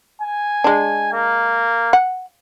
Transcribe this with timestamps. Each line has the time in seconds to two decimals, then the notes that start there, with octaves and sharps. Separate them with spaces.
0.22 G#5
0.64 G#3 D4
1.13 A#3
1.93 F#5